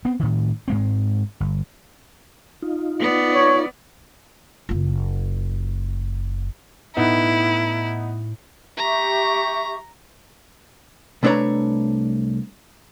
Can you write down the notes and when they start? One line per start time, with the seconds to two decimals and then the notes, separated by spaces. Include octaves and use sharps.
0.05 B3 C4
0.19 A2 D#3
0.68 G#2 G#3 C4
1.40 G1
2.62 D#4 F4
2.99 B3 D5
3.34 C#5
4.69 F#1 F4
6.97 A2 B3 D#4 E4 F#5
8.78 G4 E5 A#5 C#6
11.23 C2 A3 D4 B4 C#5 A#5